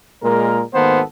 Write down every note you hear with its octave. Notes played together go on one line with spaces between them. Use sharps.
A#2 G#3 A#4
G#1 D#3 A#3 B3 A4 C5